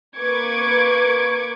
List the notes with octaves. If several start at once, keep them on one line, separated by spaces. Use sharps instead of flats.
A#3 B4 C#6 D6 G#6 D7